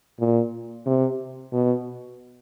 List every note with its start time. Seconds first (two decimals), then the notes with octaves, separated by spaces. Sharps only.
0.20 A#2
0.86 C3
1.53 B2